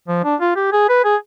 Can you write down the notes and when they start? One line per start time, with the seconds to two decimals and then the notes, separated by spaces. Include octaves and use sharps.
0.08 F3
0.24 D4
0.41 F4
0.56 G4
0.73 G#4
0.89 B4
1.05 G#4